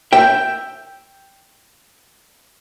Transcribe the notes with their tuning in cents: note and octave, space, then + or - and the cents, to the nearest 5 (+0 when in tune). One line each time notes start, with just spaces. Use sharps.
E5 +0 G5 +0